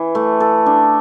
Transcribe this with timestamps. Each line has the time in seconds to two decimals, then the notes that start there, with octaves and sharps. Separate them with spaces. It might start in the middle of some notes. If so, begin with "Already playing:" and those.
Already playing: E3
0.15 A3
0.40 A4
0.66 D4